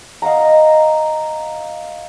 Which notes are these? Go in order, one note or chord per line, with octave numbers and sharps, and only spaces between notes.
D#5 F5 F#5 A#5